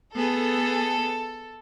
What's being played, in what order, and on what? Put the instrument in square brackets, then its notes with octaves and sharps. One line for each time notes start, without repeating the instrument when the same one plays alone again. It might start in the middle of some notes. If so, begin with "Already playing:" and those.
[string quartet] B3 G#4 [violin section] A4